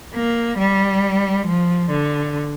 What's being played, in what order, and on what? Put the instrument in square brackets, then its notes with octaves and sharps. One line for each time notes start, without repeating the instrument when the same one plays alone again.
[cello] A#3
G3
F3
D3